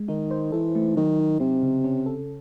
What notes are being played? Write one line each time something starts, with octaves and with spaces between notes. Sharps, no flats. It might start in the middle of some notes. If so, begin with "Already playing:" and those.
Already playing: G#3
D#3 D#4
C5
E3 A4
A3
D#3 F#3
D#4
C3 C4
C#3
C#4
A4